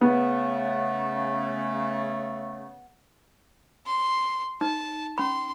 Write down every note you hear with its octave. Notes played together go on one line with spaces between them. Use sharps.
C#3 A3 B3
C6
D#4 A5
C#4 B5 C6